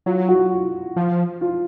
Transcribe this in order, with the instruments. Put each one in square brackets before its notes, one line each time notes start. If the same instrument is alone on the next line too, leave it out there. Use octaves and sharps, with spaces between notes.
[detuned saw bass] F#3 [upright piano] F4
[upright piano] F#4
F4
[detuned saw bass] F3
[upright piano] F4